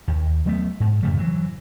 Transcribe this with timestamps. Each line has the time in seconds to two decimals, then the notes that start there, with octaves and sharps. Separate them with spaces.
0.08 D#2
0.46 F#3 A3 B3
0.80 G#2
1.03 F2 C#3 F3 A3
1.17 E3 F#3